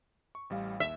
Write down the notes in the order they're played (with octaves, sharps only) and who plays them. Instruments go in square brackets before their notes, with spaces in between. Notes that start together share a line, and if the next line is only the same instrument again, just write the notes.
[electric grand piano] C#6
A1 G3 F5
[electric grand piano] D#2 [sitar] E5